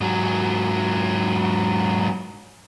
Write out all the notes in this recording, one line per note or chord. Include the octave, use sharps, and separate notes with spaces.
G#2 F#3